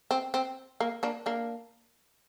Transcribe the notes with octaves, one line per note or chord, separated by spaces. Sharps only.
C4
C4
A#3
A#3 D4
A#3 D4